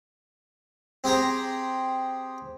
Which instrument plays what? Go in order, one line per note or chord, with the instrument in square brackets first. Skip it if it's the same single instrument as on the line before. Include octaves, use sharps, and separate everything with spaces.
[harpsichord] C4 G4 G#4 G5 A#5